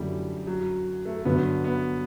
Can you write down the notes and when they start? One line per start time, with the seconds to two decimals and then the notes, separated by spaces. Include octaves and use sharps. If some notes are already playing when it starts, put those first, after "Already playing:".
Already playing: F#2 D3 G3 A3 E4
0.47 F#3
1.05 A3
1.25 G2 D3 F#3 B3
1.64 B3